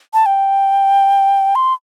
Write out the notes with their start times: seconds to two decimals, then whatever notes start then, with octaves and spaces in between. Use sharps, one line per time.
0.14 A5
0.26 G5
1.55 C6